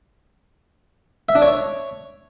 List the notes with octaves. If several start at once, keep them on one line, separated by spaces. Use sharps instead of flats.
E5
D4
C#5